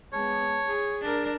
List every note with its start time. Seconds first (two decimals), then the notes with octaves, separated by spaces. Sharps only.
0.13 G#3 B3 C#5 A5
0.67 G#4
1.01 D4 A#4 D5